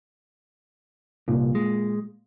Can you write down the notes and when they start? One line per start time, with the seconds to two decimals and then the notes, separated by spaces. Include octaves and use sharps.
1.28 C2 A#2
1.55 G#3